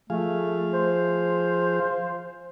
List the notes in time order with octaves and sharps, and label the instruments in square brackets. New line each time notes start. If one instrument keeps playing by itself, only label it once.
[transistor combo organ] F3 G#4 F5 [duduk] A3
[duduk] C5